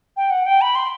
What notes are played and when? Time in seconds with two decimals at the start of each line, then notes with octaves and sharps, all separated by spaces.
0.17 G5
0.30 F#5
0.46 G5
0.61 B5
0.75 C6